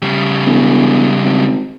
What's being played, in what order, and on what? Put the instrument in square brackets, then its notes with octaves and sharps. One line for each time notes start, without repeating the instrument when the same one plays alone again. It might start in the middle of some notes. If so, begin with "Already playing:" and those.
[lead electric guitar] C#3 G3
[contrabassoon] E1
G#1